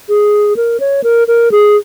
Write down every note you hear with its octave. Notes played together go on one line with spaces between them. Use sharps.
G#4
A#4
C#5
A#4
A#4
G#4